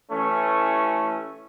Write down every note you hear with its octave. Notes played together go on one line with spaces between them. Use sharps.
A1 E3 A3 C#4